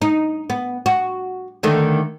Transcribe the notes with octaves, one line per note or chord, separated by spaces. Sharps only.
D#4
B3
F#4
D3 D#3 A3